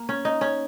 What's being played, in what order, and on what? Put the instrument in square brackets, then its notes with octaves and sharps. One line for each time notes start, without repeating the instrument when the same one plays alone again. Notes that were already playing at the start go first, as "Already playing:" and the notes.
Already playing: [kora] A#3
C#4
D#4
C#4